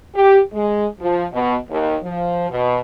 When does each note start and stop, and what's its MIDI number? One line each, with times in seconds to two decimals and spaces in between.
0.15 0.40 67
0.53 0.86 56
1.00 1.26 53
1.33 1.55 47
1.69 1.97 39
2.03 2.49 53
2.50 2.80 47